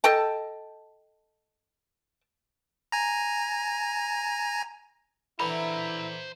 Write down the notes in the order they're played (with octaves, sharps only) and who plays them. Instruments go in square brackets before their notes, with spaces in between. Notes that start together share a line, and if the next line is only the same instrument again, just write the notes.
[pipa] A4 D#5 G5 A5
[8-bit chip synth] G#5 A#5
[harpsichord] D3 E3 [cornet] E4 [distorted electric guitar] C5 A#5 [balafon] B5